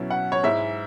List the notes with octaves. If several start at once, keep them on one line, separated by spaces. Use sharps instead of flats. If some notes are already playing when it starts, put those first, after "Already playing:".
Already playing: B2 F#3 C#4 E4
F#5
C#5
G#2 G#3 E4 E5